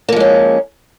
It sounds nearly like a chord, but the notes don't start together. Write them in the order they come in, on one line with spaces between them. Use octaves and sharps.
A#3 F3 G#3 C#4